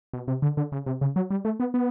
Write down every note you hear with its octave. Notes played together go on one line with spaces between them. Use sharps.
B2
C3
D3
D3
C#3
C3
C#3
F#3
G3
A3
B3
B3